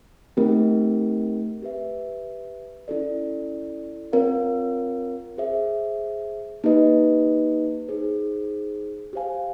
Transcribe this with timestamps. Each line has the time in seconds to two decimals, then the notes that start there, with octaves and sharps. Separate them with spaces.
0.37 A3 C4 D#4 G4 A#4
1.62 G4 B4 E5
2.88 C#4 E4 A4 D5
4.13 C4 F4 A#4 C#5 F5
5.38 G#4 C5 E5
6.64 A#3 D#4 G4 B4 D#5
7.88 D#4 G#4 C5
9.13 G4 C5 F5 G#5